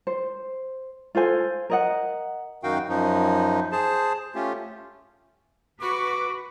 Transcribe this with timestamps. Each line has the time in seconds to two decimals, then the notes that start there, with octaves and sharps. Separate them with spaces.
0.07 C5
1.15 F4 A4 C5 G#5
1.70 A#4 D#5 F#5
2.63 F#2 D#3 D#4 F#4 F5 G5
2.89 F#2 F3 D#4
3.72 G#4 C5 A5
4.35 A3 C#4 F4 G4
5.81 F#4 B4 C#6 D6